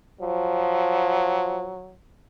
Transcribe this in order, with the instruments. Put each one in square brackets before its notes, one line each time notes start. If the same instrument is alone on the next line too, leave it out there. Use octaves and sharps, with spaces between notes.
[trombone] F3 [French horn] F#3